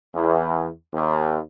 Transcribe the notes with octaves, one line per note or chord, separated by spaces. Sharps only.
E2
D#2